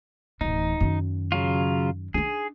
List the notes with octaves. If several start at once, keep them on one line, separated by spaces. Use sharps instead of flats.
D1 E3 D#4
F#2 D#3
C#3 F#3 F4
D4 D#4 G#4